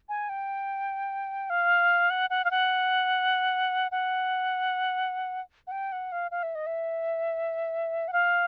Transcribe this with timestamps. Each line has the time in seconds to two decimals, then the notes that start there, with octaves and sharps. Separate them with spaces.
0.09 G#5
0.29 G5
1.50 F5
2.10 F#5
2.30 F#5
2.45 F5
2.51 F#5
3.92 F#5
5.67 F#5
5.72 G5
5.92 F#5
6.12 F5
6.31 F5
6.43 E5
6.55 D#5
6.66 E5
8.08 F#5
8.13 F5